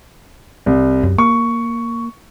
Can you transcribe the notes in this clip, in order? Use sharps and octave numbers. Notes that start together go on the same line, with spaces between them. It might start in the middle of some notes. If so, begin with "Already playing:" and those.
C2
F#2
A#3 C#6